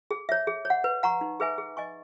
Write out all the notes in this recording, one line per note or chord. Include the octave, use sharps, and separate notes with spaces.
G#4
C#5 E5
G#4
C#5
F#5
B4
F#5 A#5 C#6
D#4
G#4 B4 E5 G#5
G#4
D#5 G#5 C#6